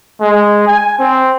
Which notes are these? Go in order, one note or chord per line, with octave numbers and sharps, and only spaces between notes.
G#3
G#5
C4